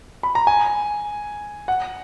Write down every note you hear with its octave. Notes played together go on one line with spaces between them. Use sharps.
B5
A#5
G#5
F#5